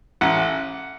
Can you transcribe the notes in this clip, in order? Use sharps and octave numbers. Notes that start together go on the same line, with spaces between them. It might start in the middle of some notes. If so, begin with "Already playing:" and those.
A1 F#5